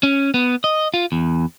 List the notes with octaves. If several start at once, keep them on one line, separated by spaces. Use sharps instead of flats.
C#4
B3
D#5
F4
E2